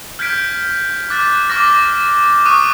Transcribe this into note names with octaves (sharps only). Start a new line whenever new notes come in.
F6 G6 G#6 B6 D7
D6 F#6 A6
D6 F6 A#6
C#6 D#6 F#6 D#7